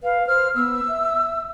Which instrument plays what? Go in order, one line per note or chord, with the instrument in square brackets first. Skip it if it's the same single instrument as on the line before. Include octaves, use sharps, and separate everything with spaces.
[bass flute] B4 [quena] F5
[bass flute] C5 [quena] F6
[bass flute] B3 [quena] E6
[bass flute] E5